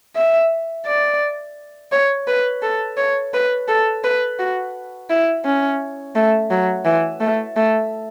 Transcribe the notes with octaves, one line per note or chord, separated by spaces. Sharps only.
E5
D5
C#5
B4
A4
C#5
B4
A4
B4
F#4
E4
C#4
A3
F#3
E3
A3
A3